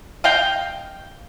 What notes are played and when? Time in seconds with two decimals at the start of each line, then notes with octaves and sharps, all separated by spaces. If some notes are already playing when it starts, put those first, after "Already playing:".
0.24 D#5 F5 G5